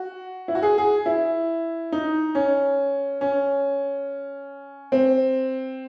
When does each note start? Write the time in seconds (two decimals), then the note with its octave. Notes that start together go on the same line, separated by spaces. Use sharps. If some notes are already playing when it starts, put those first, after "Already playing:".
Already playing: F#4
0.48 E4
0.55 F#4
0.62 G#4
0.78 G#4
1.06 E4
1.92 D#4
2.35 C#4
3.21 C#4
4.92 C4